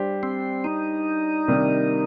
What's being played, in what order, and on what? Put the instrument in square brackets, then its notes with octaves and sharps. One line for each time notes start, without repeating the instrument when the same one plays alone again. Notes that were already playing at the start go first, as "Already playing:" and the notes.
Already playing: [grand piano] G3 D4 G4 C5
[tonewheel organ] C4
D#4
[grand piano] C3 D#3 G3 A#3 D4